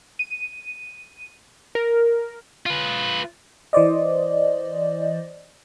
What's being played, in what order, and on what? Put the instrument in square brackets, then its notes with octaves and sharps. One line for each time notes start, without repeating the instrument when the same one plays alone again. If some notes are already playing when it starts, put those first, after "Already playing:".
[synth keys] D#7
A#4
[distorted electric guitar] F4 B4
[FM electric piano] E3 C5 D5 D#5